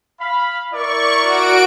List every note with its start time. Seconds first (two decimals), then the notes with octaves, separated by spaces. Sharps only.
0.21 F5 B5
0.73 E4 A#4 D5 C#6
1.22 F#4 D7